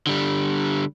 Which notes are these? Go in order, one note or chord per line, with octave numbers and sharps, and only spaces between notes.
D3 G3